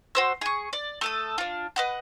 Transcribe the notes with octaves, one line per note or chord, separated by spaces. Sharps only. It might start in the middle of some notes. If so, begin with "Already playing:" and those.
F#4 C5 E6
G#4 C#6
D5
A3 A4 D#6
D4 F4
B4 D#5 F#5